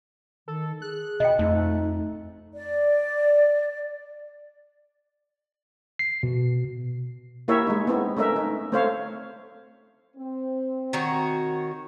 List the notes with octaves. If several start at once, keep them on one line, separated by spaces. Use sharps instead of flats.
D#3 A4
G#4 F#6
B2 D#5 G5
F2 A3 D#4
D5
C7
B2
A#3 E4 G4 A#4 C#5 E5
G#3 D#4
B3 C4 D#4 E4
A3 C#4 D#4 A#4 E5
D#4
A3 C4 C5 C#5 F5
C4
D#3 F#4 C#5